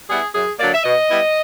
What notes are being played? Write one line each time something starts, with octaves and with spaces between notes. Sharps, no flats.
G3 B3 E4 G#4
F#2 G#4
D3 F#3 A#3 D5
E5
B2 D#5
G3 B3 E4